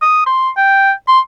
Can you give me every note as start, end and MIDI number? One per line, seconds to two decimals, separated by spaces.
0.02 0.22 87
0.26 0.49 84
0.57 0.92 79
1.08 1.19 84